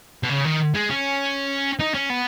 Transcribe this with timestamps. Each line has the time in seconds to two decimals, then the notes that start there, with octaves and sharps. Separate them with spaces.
0.23 B2
0.29 C#3
0.45 D#3
0.75 G#3
0.90 C#4
1.80 D#4
1.94 C#4
2.10 B3